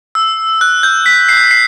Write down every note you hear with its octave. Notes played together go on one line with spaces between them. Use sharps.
E6
F#6
G6
B6
C7
C7